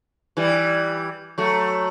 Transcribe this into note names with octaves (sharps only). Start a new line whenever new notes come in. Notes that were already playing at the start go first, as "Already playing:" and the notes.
E3 G3
F#3 A3